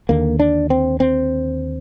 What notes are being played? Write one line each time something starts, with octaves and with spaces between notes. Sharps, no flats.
D#2 D3 A#3
D4
C4
C4